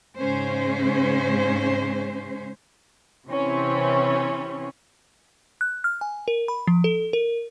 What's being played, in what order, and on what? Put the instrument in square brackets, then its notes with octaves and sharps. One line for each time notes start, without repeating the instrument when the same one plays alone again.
[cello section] G#2 C#3 G#3 C#4 C5
[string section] C3 E3 C4 C#4
[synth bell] F#6
F6
G#5
A#4
B5
F3
A4
A#4